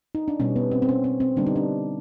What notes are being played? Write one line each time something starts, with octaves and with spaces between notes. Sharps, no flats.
D#4
D4
B2 G3 B3 C#4
B3
C4
C4
C#4
C4
C4
D3 G3 B3 D4
D#4
D4